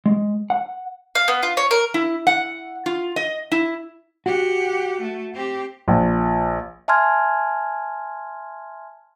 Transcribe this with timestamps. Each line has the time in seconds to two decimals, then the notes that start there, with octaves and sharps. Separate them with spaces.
0.06 G#3
0.50 F#5
1.15 F5
1.28 B3
1.43 F4
1.57 C#5
1.71 A#4
1.94 E4
2.27 F#5
2.86 F4
3.16 D#5
3.52 E4
4.26 F#4 G4 F#5
5.00 A3
5.34 C4 G4
5.88 A#1
6.88 E5 G#5 A5 C6 F6 G#6